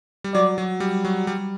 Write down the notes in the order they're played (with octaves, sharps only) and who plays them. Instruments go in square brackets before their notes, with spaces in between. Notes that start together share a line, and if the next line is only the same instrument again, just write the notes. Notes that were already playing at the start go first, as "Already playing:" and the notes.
[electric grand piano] G3
[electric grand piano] F#3 [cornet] D5
[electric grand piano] F#3
G3
F#3
G3